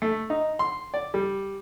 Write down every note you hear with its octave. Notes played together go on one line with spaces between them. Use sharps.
A3
D#4
C6
D5
G3